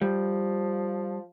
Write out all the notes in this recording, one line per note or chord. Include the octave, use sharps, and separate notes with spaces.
F3 G3